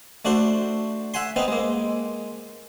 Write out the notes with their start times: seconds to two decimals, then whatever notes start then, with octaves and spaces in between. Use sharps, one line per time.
0.25 A3 D4 F#4 C5
1.14 E5 F#5 G#5 C6
1.36 B3 C4 D#4
1.48 G#3 A#3